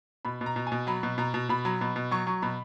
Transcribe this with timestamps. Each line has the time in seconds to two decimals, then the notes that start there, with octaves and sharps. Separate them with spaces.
0.25 B2 B5
0.41 B2
0.46 A#5
0.56 B2
0.67 B2 G#5
0.87 F#3 B5
1.03 B2
1.18 B2 A#5
1.34 B2
1.49 B2 B5
1.65 F#3
1.81 B2
1.96 B2
2.11 F#3 C#6
2.27 F#3
2.42 B2 B5